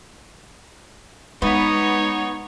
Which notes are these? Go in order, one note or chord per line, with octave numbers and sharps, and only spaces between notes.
G#3 B3 D#4 C#5